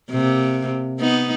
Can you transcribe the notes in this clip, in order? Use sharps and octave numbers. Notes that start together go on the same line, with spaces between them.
C3 A#3
B3 D#4